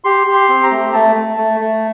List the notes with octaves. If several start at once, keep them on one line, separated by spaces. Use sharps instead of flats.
G4 C6
G4
C6
C4
A#5
A3
A3 A5
A3
A3
A3